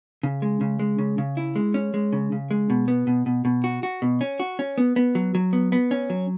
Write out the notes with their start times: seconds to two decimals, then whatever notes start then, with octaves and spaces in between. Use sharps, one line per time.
0.23 C#3
0.42 G#3
0.61 C#3
0.79 G#3
0.99 C#3
1.18 C#3
1.37 E4
1.56 G#3
1.74 C#4
1.94 G#3
2.13 C#3
2.32 C#3
2.51 G#3
2.70 B2
2.88 B3
3.07 B2
3.26 B2
3.45 B2
3.64 F#4
3.83 F#4
4.02 B2
4.21 C#4
4.40 F#4
4.59 C#4
4.78 B3
4.96 B3
5.15 F#3
5.35 F#3
5.53 B3
5.72 B3
5.91 C#4
6.10 F#3